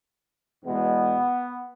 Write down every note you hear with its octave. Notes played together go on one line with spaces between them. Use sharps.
E2 B2 G#3 B3